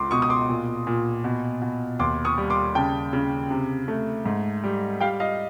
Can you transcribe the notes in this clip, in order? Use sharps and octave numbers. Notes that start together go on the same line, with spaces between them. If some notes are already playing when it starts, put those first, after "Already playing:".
Already playing: C#2 C6 D6
B2 C#6 D#6
D#6
C6 D6
A#2
A#2
B2
B2
D#2 C6 D6
C#6 D#6
G3
C6 D6
C#3 G5 A5
C#3
C3
A3
G#2
G3
G3 F5 G5
D#5 F5